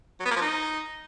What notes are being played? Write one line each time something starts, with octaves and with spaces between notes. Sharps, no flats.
F#3
B3
A#3
F3
D#4